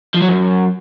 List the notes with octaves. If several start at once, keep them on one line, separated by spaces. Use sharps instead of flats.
F3
F#3
F#2